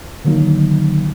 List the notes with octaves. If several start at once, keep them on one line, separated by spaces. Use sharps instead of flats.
D3 D#3 F#3 A#3 D#4